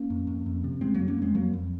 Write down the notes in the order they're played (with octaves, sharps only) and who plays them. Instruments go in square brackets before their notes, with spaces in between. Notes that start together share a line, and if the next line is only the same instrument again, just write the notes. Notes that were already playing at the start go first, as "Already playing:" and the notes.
Already playing: [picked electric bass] A#3 C#4
F2
F2
F2
C3
C#3 G#3 C4
F2 F#3 A#3
A#3 C#4
F2 G#3 C4
F2 F#3 A#3
F2